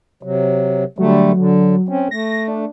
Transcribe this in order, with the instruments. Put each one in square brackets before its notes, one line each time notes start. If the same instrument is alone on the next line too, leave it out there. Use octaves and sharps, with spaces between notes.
[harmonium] C3 F#3
[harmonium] D3 G3 A3 [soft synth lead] F#3
[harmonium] D3
C4 C#4
[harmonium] A3 [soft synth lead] A#6
[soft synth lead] D4